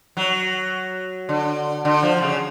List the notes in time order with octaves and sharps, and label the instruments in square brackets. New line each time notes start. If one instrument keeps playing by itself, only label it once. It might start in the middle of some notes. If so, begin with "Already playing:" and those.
[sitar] F#3
D3
D3
F3
C#3